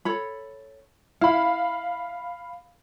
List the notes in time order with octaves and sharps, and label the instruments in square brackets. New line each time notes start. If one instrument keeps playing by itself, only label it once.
[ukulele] A4 C#5 B5
[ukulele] E4 [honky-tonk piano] F5 B5